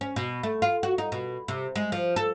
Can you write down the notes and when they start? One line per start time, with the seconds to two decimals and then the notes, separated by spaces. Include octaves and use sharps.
0.01 C#4
0.16 B2
0.43 A3
0.62 F4
0.83 F#4
0.98 D#4
1.12 B2
1.48 C3
1.76 G#3
1.92 F3
2.16 A4